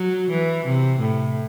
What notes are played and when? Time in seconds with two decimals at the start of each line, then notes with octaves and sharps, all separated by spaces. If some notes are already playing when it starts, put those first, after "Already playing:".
Already playing: F#3
0.30 E3
0.66 C3
1.00 A2